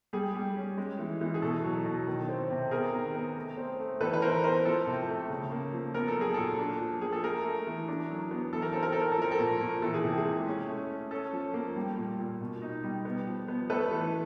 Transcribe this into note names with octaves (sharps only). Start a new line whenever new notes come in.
G3 G#4
G3
C#4
G#3
E3
E3
G#4
B2 A4
F#3
B2
D#3
C4
C3
B3 G#4 A#4
D#3
B3
A3
C4
A3
E3 A4 B4
B4
E3 A#4 C5
B3 A#4 C5
F3 A4
C3
A3
C#3
A#3
F3
B3 A#4
A4
F#3
G#4
A#2 A4
D4
F3
A#3 G#4
A4
A3 G#4 A#4
A3
E3
D4
F#3
B3
E3 A4
A#4
C4 A4
A#4
C4 A4
A#4
A4
F3 A#4
A4
A#2
A#2
E3 A4
G#4
C3
G#4
G#3
C#4
A3
C#4
C#4 A4
F3
A#3
G3
A#2
A#2
B2
D#4
G3
B3
F3
B3
A3 A4 B4
E3